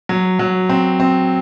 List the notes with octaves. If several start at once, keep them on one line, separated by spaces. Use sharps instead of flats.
F#3
F#3
C4
C4